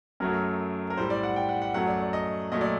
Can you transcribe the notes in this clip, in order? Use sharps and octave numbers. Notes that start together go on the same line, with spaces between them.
F#2 F#3 A3 A#4
A#4
A2 G3 C5
D5
F#5
G5
F#5
F#5
F#2 F#3 A3 F#5
D5
D5
D#5
A#2 F#3 A3 D#5
D5